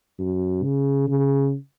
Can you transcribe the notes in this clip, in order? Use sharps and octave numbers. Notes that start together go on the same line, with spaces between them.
F#2
C#3
C#3